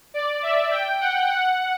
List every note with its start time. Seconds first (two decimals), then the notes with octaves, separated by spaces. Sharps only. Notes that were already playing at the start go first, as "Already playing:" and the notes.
0.14 D5
0.42 E5
0.71 G5
1.00 F#5
1.29 F#5